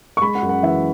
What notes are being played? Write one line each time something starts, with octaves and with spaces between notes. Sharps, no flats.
C#6
G#3 B5
F#5
F#2
F#5
E3 E5